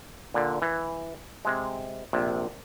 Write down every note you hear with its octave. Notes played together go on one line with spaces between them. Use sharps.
A#2 D3
E3
C3 G#3
A#1 C3